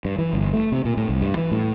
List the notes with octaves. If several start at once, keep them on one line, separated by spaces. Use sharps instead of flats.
G2
E3
G1
A3
C3
A#2
A2
C2
G2
E3
A2